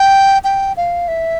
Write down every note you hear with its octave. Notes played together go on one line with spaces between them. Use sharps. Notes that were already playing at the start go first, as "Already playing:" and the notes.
Already playing: G5
G5
F5
E5